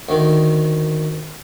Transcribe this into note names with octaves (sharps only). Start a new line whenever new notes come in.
D2 D#3